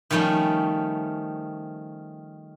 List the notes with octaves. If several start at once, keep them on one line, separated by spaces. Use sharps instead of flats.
D#3 F3 G3 A3 C#4